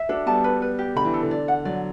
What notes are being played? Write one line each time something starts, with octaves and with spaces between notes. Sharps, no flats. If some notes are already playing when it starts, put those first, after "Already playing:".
Already playing: E5
D4 F#4 A4
G3 B3 A5
B4
B4
G4
D3 B5
E3
A4
D3
D5
F#5
D3 F#3 D5